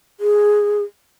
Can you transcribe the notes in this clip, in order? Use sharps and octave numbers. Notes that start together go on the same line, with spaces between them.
G#4